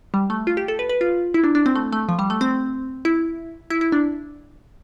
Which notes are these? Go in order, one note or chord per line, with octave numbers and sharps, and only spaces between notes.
G3
A3
F4
G4
A4
B4
B4
F4
E4
D4
D4
C4
A3
A3
F3
G3
A3
C4
E4
E4
E4
D4